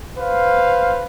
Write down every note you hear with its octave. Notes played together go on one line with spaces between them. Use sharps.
B4 C5 F5